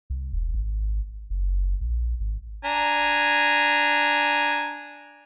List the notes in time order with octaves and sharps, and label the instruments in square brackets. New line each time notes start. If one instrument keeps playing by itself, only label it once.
[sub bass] C2
E1
G#1
F#1
A#1
G#1
[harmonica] D4 G#5 A#5